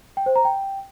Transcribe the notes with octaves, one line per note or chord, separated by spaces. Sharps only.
G5
C5
A#5
G5